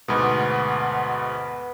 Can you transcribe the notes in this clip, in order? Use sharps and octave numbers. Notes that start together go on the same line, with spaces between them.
D2 G#2 B2 B3